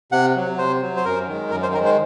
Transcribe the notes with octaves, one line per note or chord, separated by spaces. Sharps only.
C3 F#5
F#3
C3 C5
F#3
C5
F#2 A#4
D#3 G#3
F#2 A#4
C5
D#3 G#3 A#4
C5